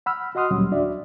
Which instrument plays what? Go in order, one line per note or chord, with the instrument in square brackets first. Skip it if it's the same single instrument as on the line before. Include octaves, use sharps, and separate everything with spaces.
[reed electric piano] F#5 B5 E6 F6
F#4 D#5 F#5 C6 D#6 F6
D2 A#2 F#3 G3 C#4
D#2 D4 F#4 D5 E5